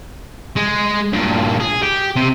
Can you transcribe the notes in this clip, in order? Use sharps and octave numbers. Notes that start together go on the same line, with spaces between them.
G#3
G2 A#2
G#4
G4
C3